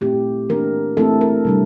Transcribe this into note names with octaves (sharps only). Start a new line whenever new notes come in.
A#2 A3 C4 E4 G4
E3 A#3 D4 A#4
E3 A3 C4 E4 A4
A#4
C3 G3 D4